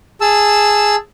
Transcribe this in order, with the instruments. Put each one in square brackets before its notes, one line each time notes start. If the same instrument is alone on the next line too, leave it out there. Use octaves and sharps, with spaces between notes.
[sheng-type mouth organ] G#4 A5 E6